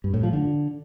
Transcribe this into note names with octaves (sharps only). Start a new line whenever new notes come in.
G2
A2
F3
D3